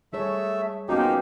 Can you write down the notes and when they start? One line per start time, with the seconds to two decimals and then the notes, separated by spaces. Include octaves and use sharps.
0.13 G3 A3 G#4 C#5 E5
0.89 F3 A#3 B3 C#4 D#4 F#4 G4